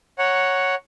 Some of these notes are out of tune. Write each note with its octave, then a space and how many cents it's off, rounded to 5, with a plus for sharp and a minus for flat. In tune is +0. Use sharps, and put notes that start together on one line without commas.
C#5 +0 F#5 +0 A#5 +0